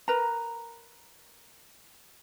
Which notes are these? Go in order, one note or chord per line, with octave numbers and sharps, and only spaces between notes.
A#4 B4 A#5